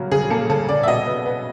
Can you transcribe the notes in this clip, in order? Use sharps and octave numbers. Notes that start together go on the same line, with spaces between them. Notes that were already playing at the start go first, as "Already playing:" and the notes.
Already playing: C#3 F#3 A#3
C#3 G#4
A#3 A4
C#3 A4
C#3 D5
E5
B2 D#5
B3
B3